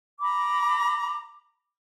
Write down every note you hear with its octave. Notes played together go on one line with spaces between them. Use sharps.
A#5 B5 D6